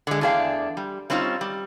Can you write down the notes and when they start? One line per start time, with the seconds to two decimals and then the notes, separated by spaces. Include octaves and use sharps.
0.07 D3 G#3
0.21 E2 A3 D4 G#4 F5 G5
0.77 G3
1.10 G3 C4 C#4 D#4 F4
1.41 G3